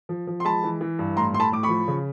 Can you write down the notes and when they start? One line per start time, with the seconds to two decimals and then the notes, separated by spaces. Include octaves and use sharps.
0.09 F3
0.27 F3
0.40 C6
0.45 G#3 A5 B5
0.63 E3
0.81 E3
0.99 G2
1.17 A2 A#5 C6
1.33 A2 C6
1.40 A5 B5
1.52 A2 D6
1.63 B5 C#6
1.69 F3
1.88 C#3